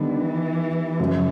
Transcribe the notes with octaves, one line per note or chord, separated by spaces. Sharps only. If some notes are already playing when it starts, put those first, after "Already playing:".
Already playing: D3 D#3 G3 B3
E3
F#2 C#3 F3 F#3